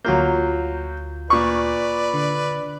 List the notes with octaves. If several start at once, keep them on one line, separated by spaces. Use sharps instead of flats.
D2 F#3 A#3 F4 G6
A#2 B4 D5 C#6
D3